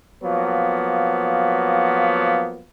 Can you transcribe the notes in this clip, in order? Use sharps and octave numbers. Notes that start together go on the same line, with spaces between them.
F3 F#3 A#3 B3